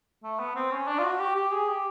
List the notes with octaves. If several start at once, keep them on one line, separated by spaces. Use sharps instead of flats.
A3
B3
C4
C#4
D4
F4
F#4
G4
G4
G#4
G4